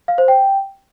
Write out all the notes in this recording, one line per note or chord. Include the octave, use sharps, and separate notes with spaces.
F5
C5
G5